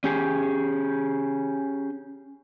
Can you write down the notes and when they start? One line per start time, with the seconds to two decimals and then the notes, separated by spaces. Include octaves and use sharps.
0.04 C#4 G4 G#4